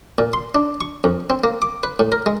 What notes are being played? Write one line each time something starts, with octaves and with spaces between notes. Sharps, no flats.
A#2
C6
D4
C#6
F2
C4
A#3
D6
B4
A2
A#4
G#3